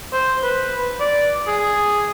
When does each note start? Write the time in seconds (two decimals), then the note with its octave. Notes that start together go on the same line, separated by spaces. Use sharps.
0.13 C5
0.43 B4
1.00 D5
1.47 G#4